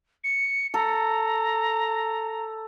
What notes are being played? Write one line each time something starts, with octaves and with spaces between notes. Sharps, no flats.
C#7
A4 A#5